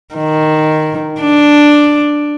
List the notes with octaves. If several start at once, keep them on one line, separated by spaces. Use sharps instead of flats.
D#3
D4